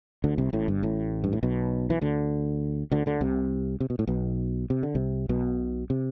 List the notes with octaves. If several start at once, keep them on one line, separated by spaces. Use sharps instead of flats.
D2 D3
C2 C3
A1 A2
G1 G2
A1 A2
G2
A2
B1 B2
E3
D2 D3
D2 D3
D2 D3
C2 C3
C3
B2
A2
B1 B2
C3
D3
C2 C3
B1 B2
C3